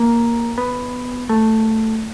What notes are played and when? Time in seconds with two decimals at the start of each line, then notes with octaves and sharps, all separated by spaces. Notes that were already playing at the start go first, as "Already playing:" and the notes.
Already playing: A#3
0.58 B3
1.29 A3